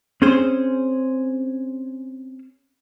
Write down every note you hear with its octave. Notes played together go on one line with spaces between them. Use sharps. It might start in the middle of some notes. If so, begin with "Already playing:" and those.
C4 C#4 G#4 C5